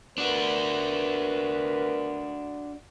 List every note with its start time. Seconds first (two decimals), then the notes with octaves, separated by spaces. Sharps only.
0.18 B3 D4 F#4 A#4 B4